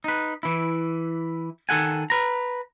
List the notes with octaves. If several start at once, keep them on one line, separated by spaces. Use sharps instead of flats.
D#4 B4
E3 E4
D#3 A4 F#5 G#5
B4 A#5